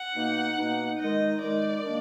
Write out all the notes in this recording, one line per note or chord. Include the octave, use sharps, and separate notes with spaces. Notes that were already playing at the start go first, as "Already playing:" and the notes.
Already playing: F#5
B2 A#3 D#4
B2 A#3 D#4
D#3 G#3 D#4 D#5
D#3 G#3 D#4 D5
D#3 A#3 D4